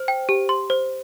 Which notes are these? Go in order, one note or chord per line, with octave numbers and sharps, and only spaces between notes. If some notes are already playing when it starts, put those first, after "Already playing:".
Already playing: C5
G5
G4
C6
C5